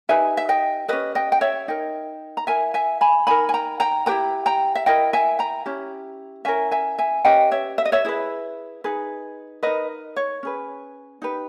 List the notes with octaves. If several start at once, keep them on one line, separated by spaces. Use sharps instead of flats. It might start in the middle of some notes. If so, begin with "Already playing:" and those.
D#4 G4 B4 E5 G#5
E5
D#5 G5
C#4 G4 A#4 B4 D#5
D#5 G5
G5
C#5 E5
D#4 A#4 D#5 G5
A#5
E4 A#4 E5 G#5
E5 G#5
G#5 B5
D#4 A#4 G#5 B5
G#5
G5 A#5
G5 A#5
E4 G4 B4 G5 A#5
G5 A#5
E5
E4 A#4 D#5 G5
E5 G#5
G5 A#5
C#4 E4 G4
C#4 E4 A#4 E5 G#5
E5 G#5
E5 G#5
C#4 G4 B4 D#5 G5
C#5 E5
E5
D#5
C#5 E5
E4 G#4 B4
D#4 G#4 B4
D#4 A#4 B4 D#5
C#5
C#4 G#4 B4
D#4 G4 B4